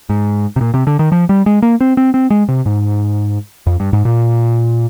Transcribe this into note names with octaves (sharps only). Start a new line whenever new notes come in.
G#2
C3
A#2
C3
D3
D#3
F3
G3
G#3
A#3
C4
C4
C4
G#3
C3
G#2
F2
G2
G#2
A#2